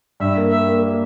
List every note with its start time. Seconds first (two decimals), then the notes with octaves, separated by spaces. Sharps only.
0.20 G2 E5
0.36 A#3
0.51 A#3 E5
0.67 A#3
0.82 A#3